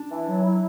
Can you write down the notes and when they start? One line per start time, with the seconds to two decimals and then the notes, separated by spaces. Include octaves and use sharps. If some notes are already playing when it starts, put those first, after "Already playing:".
Already playing: D4
0.10 E3
0.27 F#3
0.43 E4